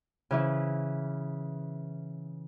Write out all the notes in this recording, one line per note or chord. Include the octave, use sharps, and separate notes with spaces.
C#3 E3 E4